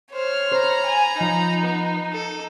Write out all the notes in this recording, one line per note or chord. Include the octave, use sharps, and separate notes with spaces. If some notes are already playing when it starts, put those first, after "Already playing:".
C5 C#5 F6
C5 A#5 B5
G#5
F3 D#4
B3
A4